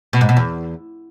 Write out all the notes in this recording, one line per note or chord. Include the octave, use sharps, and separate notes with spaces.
B2
G#2
B2
E2